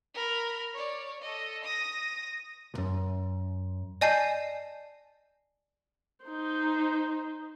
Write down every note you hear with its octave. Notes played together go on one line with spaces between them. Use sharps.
A#4 B5
C#5 D5
A4 D#5
D#6 A#6
B1 F#2
D5 D#5 G#5 A5 G6 C7
D#4 C5